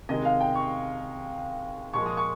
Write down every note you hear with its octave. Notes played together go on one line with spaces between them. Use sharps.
C3 D#3 G#3 D#5
F5
G5
C#6
A#2 F3 G#3 C#6
D#6
C#6